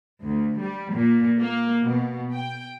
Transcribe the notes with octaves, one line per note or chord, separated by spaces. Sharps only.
D2
G3
A#2
A#3
B2
G5